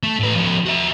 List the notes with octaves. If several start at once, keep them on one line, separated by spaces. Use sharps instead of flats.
A3
A2 B4
F3 C#4
F#4 E5